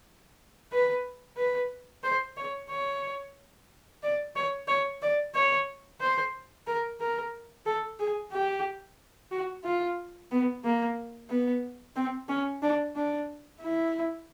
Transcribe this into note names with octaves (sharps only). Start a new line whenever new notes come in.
B4
B4
C5
C#5
C#5
D5
C#5
C#5
D5
C#5
C5
A#4
A#4
A4
G#4
G4
F#4
F4
B3
A#3
B3
C4
C#4
D4
D4
E4